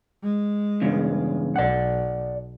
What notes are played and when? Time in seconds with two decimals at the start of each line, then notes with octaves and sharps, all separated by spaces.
0.23 G#3
0.82 E2 G2 C#3
1.56 B1 D5 F#5